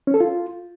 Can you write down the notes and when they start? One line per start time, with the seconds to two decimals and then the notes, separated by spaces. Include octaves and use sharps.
0.07 C#4
0.14 A4
0.20 F4